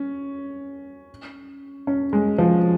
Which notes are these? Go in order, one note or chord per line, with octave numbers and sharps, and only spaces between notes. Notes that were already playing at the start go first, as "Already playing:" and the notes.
Already playing: C#4
C#4
G#3
F3